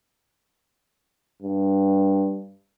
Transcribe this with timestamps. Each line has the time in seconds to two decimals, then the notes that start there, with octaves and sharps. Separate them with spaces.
1.42 G2